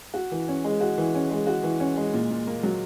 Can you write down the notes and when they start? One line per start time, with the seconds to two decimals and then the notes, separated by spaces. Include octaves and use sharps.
0.14 F#4
0.32 E3
0.48 C#4
0.64 G#3
0.81 F#4
0.98 E3
1.15 C#4
1.30 G#3
1.47 F#4
1.63 E3
1.80 C#4
1.97 G#3
2.13 A#2
2.30 A#2
2.47 A#3
2.63 F#3